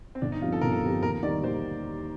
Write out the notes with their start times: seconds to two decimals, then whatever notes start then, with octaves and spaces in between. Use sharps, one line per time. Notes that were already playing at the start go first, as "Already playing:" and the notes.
0.15 C4
0.22 G1 D4
0.32 D#4
0.42 G2 F3 C4 F4 G4
0.52 A4
0.61 G1 A#4
0.72 A4
0.83 G2 F3 C4 G4
1.02 D#2 A#4
1.23 D#3 G3 D5
1.43 D#2 C5